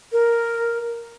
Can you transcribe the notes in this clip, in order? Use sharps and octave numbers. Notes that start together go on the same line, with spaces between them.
A#4